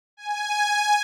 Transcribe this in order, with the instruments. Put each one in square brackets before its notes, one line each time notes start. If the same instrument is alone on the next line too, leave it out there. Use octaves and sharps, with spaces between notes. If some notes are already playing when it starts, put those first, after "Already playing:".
[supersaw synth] G#5